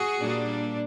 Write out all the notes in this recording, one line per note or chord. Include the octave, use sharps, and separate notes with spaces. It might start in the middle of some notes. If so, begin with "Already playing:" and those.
Already playing: F#4 G#4
A#2 G3 A#3 D4